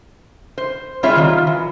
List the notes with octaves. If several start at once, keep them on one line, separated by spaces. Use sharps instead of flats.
C5
G3 C4 F4 G#4 C#5 E5
D#3 G3 F4
E3